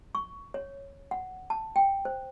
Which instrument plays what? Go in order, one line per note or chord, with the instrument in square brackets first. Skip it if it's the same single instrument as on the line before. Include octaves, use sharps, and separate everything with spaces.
[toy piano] C#6
C#5
F#5
A5
G5
C5